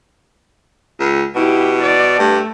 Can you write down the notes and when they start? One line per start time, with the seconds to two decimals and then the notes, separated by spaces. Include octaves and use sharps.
1.00 C#2
1.35 B2 E4 G4
1.82 D5
2.19 G2 A3